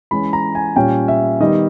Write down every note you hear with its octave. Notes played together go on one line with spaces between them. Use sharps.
E3 G#3 C#4 B5
A#5
G#5
A#2 G3 C#4 G5
E5
D#3 G3 B3 D#5